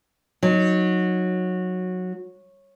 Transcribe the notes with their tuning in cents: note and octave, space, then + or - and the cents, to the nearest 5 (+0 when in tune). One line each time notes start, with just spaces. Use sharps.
F#3 -15 D#4 +0